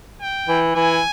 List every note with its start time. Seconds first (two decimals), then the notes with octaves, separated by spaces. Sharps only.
0.22 G5
0.48 E3
0.75 E3 G#5